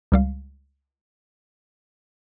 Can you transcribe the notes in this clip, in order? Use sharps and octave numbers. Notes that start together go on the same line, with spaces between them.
C#2 G3 F5